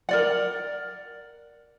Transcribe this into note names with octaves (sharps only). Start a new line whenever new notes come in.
A#4 D5 F#5